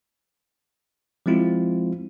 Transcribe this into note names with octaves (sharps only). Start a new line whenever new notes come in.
F3 G#3 C4 E4 F4